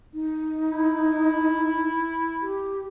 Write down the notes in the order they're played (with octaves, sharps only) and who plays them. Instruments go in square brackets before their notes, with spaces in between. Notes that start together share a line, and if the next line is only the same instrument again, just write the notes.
[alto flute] D#4
[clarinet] E4
[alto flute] G4